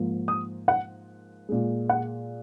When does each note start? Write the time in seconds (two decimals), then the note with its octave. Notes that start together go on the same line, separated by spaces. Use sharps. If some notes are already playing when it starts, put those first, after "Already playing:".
Already playing: G#2 F3 A#3
0.28 D#6
0.68 F#5
1.49 A#2 G#3
1.89 F#5